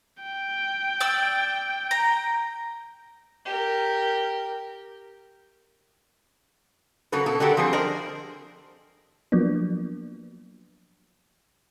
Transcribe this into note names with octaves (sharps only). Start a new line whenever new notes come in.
G5
D5 E6
A#5
G4 A#4
C#3 F#3 A#3 A4 B4
B2 A4
D3 D4 F#4 G4 A4 A#4
F3 G3 C4 G#4 C5
D4 A#4 C5 D5 D#5
F3 F#3 A#3 B3 D4